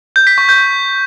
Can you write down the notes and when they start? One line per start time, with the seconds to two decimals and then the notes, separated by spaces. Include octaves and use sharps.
0.16 G6
0.27 B6
0.38 C#6
0.49 G6